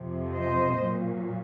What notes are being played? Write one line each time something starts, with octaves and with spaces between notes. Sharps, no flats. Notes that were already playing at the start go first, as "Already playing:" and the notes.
Already playing: F2 C3 F3
C5 D#5
A#2 F#3